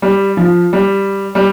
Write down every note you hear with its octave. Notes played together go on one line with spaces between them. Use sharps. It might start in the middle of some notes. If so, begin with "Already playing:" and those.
G3
F3
G3
G3